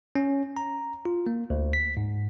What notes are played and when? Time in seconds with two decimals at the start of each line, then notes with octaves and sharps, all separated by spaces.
0.15 C#4
0.57 A#5
1.05 F4
1.27 A#3
1.50 D2
1.73 B6
1.97 G#2